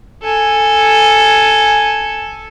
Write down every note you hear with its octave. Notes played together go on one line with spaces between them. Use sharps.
A4 G#5